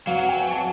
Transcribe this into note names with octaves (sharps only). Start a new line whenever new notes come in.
F#3 F5
F#5
G5
G#5
A5